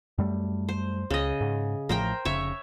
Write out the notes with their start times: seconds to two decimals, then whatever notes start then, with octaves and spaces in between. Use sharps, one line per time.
0.18 F#2 G3 A3
0.69 C5
1.10 C#2 C#3 D#5
1.41 G#2
1.89 A1 A2 F3 A#4 C5 G5
2.25 F1 C#3 C#5 E5